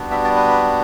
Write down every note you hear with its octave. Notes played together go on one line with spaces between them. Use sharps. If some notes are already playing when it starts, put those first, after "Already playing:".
Already playing: G3 B3 D4 F#4
E5
D5
B4